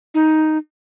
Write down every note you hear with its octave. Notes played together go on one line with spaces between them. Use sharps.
D#4